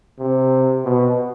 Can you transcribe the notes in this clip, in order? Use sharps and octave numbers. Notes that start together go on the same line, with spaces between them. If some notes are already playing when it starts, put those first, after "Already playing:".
C3
B2